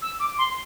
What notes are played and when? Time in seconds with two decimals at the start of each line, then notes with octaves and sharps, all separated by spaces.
0.02 E6
0.20 D6
0.38 C6